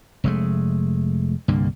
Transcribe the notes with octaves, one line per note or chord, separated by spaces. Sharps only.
F1 G#3 A3
C2 G2 D3 A#3